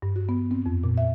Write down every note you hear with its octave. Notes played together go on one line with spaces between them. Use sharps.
G2
F#4
B3
C4
F2
A#2
E5